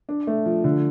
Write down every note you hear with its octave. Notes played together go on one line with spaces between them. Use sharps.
D4
A3
F3
D3